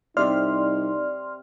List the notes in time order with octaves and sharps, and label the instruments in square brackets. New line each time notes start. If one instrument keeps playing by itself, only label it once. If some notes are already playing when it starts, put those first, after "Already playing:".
[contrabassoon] C2 [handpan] C4 G4 E5 [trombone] D#4 [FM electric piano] D5 C6 F6